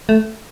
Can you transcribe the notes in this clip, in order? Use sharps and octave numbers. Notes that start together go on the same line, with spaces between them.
A3